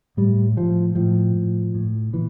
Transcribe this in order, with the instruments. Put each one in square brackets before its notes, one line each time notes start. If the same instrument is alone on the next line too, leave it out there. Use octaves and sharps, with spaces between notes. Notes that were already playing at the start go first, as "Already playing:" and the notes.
[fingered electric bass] A2 G3
A2 F3
A2 F3
A2
A2
A#2 E3